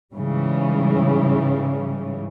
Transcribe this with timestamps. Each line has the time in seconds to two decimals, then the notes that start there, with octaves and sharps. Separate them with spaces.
0.15 G#2 C#3 E3 G3